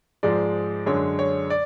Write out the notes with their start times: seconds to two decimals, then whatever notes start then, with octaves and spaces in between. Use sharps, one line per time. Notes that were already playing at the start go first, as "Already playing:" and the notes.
0.23 G#2 F3 G#3 D5
0.86 F#2 D3 G#3 C#5
1.19 C#5
1.50 D5